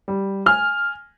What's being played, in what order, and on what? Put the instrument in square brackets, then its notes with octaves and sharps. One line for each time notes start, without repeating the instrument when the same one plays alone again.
[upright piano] G3
G#5 F6